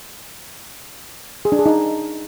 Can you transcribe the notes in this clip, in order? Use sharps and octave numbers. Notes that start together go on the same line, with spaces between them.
G#4
D4
G#4
D#4